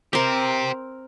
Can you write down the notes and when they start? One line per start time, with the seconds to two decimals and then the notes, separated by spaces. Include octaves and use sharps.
0.13 C4 G4 A#4 C5